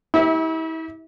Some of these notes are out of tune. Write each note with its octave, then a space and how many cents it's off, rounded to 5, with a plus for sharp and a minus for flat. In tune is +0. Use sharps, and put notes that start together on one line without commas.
E4 -40 G4 +0 E5 -20